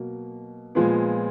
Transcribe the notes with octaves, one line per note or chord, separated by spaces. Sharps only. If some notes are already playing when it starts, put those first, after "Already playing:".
Already playing: B2 F#3 A#3
A#2 F3 G#3 B3